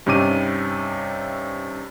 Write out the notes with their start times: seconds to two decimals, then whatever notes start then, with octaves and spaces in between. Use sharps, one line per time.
0.06 G2 C3 C#4 D#4 D6 D#7